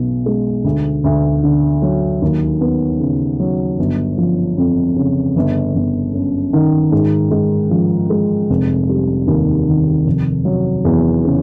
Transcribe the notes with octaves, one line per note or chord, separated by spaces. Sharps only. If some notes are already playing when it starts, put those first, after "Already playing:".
Already playing: B1 B2
G#3
D2
D2
D3
F#3
D#2
B3
C#3
F#3
G1
F3
F2
C#3
G1
G1
F#2
D#3
G#2
G#2
F3
G#3
F1
G3
D#2
D#3
F1
F#3
E2
C#3